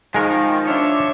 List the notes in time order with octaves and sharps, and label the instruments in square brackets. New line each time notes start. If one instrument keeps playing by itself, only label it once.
[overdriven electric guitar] D#3 [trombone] F3 [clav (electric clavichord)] G#3 A#4
[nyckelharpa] D4 E5 [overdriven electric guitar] C#5